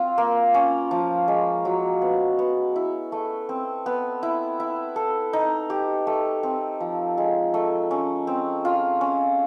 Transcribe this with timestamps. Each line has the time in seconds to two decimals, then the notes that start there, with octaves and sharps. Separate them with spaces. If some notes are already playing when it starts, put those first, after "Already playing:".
Already playing: C4 F4
0.18 A#3
0.54 C#4
0.91 F3
1.28 G#3
1.65 F#3
2.02 B3
2.39 B3
2.76 E4
3.12 A3
3.49 C4
3.86 B3
4.23 E4
4.60 E4
4.96 A4
5.33 D#4
5.70 G4
6.07 A3
6.43 C4
6.80 F3
7.18 G#3
7.54 A3
7.91 C#4
8.27 C4
8.65 F4
9.01 C#4